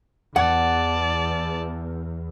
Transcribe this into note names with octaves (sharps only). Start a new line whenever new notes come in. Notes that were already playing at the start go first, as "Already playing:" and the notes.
E2 D5 F#5 A5